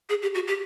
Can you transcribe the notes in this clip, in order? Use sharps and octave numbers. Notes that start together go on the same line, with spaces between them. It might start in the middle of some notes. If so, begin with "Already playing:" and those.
G#4
G4
F#4
G4